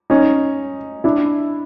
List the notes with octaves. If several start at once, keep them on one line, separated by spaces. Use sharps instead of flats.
C#4 D#4
D4 E4